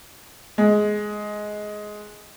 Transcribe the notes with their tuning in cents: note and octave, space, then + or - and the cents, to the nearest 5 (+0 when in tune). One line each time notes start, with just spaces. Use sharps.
G#3 +10